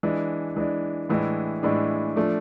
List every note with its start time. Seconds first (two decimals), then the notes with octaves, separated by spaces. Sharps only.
0.03 E3 G#3 D4
0.56 E3 G#3 D4
1.09 A2 E3 G#3 D4
1.63 A2 E3 G#3 D4
2.16 F3 A3 D4